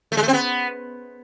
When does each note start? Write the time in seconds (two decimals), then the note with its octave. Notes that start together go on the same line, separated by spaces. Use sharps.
0.12 A3
0.17 G#3
0.23 A3
0.28 C4
0.33 B3